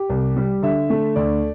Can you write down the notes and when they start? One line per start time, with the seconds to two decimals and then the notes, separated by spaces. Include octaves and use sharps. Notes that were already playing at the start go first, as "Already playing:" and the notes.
Already playing: G4
0.10 C2
0.36 G3
0.63 D3 E5
0.90 A3
1.16 D2 D5